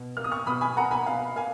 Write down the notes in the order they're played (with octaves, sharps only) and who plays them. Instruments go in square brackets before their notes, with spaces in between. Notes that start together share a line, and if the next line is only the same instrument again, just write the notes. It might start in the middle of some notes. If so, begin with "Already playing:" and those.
Already playing: [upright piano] B2
A#3 F6
D#6
C#6 F6
B2 B5 D#6
G#5 B5
A#3 F#5 A#5
G#5 B5
B2 F5
A#3 F5 G#5